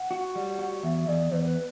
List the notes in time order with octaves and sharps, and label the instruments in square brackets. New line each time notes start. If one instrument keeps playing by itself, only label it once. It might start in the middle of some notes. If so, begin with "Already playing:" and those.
Already playing: [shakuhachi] F#5
[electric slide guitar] F#4
G3
F#4
[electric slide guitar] E2 [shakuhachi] E5
[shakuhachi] E5
[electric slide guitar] E2 [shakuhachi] D5
[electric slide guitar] E2 [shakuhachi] B4
[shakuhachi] B4